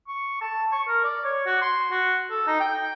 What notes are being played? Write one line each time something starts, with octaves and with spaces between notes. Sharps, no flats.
C#6
A5
C#6
A#4
D5
C#5
F#4
C6
F#4
A4
D#4
G5